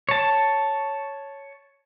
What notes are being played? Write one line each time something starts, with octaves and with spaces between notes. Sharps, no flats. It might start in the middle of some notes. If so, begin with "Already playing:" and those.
C#5 A5